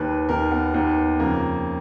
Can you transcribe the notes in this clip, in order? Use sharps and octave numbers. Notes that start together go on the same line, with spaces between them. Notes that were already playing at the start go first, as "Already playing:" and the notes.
Already playing: D#2 D#3 B4
D#2 D#3 A#4
B3
D#2 D#3 B3
F2 C#3 A#3